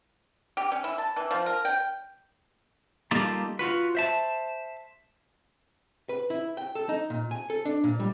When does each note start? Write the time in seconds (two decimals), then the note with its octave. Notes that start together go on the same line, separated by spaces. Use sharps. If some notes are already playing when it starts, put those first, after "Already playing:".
0.57 G4
0.72 C#4
0.84 E4
0.98 A5
1.16 E3
1.31 F3
1.46 A#4
1.65 G5
3.11 G3 A#3 D#4 F4 G4 A4
3.59 F4 F#4 B4
3.95 C5 E5 A5
6.09 B4
6.30 E4
6.57 G5
6.75 A4
6.89 D#4
7.10 A#2
7.31 G#5
7.50 A4
7.65 D4
7.84 A#2
8.00 G3